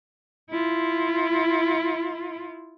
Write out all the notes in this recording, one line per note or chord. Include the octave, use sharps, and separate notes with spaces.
E4 F4